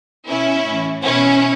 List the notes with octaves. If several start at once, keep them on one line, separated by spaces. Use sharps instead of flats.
B2 C#4 E4
A2 E3
B2 C#4 E4